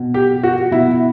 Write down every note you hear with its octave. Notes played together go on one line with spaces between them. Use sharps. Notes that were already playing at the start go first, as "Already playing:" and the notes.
Already playing: B2
G4
F#4
B2 E4